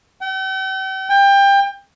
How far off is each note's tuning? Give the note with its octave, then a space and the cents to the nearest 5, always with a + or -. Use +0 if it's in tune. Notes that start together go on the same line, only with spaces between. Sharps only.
G5 -45
G5 +25